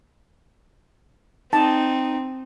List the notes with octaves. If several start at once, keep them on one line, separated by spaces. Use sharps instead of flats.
C4 D#4 A5